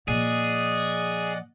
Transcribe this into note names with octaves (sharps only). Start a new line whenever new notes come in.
A#2 F3 G#4 D5 D#5 F#5